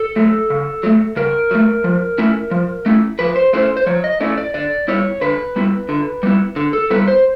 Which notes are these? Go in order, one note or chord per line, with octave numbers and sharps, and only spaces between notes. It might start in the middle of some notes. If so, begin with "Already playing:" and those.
Already playing: A4
F#3 A3
C#3
F#3 A3
C#3 A#4
F#3 A3
F3
A3 C#4 E4
F3
A3 C#4 E4
F3 B4
C5
A3 C#4 E4 C5
C5
F3 C#5
D#5
A3 C#4 E4 D5
D5
D3 D5
G3 B3 E4 C#5
D3 B4
G3 B3 E4
D3
G3 B3 E4
D3
A4
G3 B3 E4 B4
C5